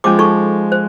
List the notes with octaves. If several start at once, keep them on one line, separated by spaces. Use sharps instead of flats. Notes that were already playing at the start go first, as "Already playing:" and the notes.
F3 G#3 C#4 D6
D#4 A4 C#6
C5